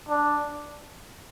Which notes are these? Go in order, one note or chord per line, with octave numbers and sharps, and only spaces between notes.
D4